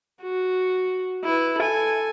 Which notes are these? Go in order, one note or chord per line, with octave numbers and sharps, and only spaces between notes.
F#4
E4 B4
A4 G#5